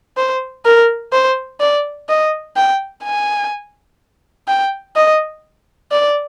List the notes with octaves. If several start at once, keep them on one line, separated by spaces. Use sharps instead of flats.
C5
A#4
C5
D5
D#5
G5
G#5
G5
D#5
D5